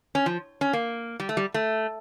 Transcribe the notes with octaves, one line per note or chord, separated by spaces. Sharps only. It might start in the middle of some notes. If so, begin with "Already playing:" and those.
C#4
F3
C#4
A#3
G3
A3
G3
A3